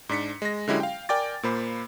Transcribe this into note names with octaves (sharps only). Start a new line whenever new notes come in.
G#2 D4 B6 C#7
G#3 A#6
D3 F#3 G#3 C#4 E4 G4
F5 G5
A#4 D5 G5 G#5 D6 A6
A#2 A#3 C5 B5